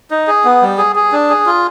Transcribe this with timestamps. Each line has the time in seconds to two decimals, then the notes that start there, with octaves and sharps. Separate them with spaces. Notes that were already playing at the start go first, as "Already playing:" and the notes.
0.11 D#4
0.27 G#4
0.45 B3
0.62 G3
0.78 G#4
0.96 G#4
1.12 D4
1.30 G#4
1.46 F4